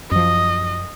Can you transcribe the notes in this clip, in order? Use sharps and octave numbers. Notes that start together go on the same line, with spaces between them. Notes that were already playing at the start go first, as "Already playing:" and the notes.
F#2 F3 D#5